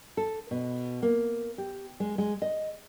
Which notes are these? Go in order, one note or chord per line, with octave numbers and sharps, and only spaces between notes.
A4
B2
A#3
G4
G#3
G#3
D#5